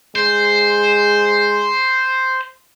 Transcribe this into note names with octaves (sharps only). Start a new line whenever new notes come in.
G#3 C5